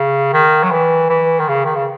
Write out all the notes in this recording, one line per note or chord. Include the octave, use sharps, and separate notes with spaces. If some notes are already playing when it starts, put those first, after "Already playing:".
Already playing: C#3
D#3
F#3
E3
E3
D#3
C#3
D#3
C#3